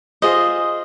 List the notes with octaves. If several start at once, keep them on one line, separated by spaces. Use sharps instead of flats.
F4 G#4 C5 D#5